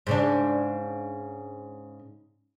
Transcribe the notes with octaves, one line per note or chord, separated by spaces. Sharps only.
G#2 C#3 D4